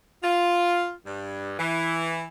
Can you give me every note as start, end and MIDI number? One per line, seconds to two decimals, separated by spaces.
0.22 0.91 65
1.05 1.54 43
1.58 2.26 52